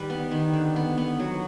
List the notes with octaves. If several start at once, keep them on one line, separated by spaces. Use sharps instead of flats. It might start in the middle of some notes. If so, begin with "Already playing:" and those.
Already playing: D#3 G3 B4
B3
D#3
D3
B3
B3
F#3